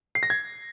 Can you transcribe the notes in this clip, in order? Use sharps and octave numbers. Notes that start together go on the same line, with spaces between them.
C7
A#6
G#6